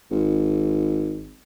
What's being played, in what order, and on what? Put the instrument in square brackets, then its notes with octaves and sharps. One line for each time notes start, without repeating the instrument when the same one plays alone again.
[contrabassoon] G#1